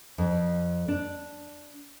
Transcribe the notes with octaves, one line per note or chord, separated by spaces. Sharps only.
F2
D4